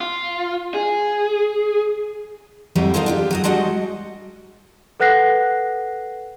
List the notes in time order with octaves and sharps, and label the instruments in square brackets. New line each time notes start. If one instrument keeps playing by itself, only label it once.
[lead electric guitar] F4
G#4
[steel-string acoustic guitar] F2 A2 F#3 G3 G4 E5
B3 D#4 F4 A4 A#4 C5
D4 F4 G4
F#3 F#4 D#5
G3 G#3 D4 F#4 D#5 F#5
[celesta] A4 B4 F#5 F#6 A#6 C7